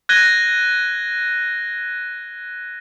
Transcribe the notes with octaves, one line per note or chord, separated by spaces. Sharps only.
F#6 G#6 A#6 D#7 G7